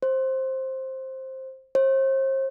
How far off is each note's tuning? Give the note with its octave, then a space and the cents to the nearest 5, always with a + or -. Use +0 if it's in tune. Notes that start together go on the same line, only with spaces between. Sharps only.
C5 +10
C5 +40